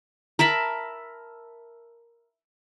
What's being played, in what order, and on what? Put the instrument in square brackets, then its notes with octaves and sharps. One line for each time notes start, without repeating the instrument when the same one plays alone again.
[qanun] A#4 E5 A5 B5